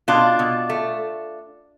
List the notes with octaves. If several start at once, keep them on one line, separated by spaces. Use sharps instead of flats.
B2 D4 F4
B2
A3